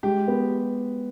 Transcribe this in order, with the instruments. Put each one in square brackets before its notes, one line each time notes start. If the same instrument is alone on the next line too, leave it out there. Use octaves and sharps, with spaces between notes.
[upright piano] G#3 [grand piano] G4
[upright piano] B3